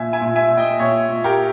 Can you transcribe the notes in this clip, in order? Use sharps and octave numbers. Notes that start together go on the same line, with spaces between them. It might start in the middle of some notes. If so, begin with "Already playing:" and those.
Already playing: A#2 E5 G#5
E5 G#5
A#2
E5 G#5
A#2
D#5 G5
A#2 C#5 E5
A#2
G4 A#4